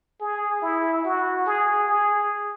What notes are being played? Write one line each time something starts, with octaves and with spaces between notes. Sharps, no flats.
G#4
E4
F#4
G#4
G#4